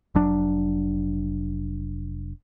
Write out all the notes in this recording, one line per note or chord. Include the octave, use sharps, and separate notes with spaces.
F1 F#3 D4